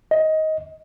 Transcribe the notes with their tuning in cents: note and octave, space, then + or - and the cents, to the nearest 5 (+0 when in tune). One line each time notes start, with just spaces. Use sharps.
D#5 +15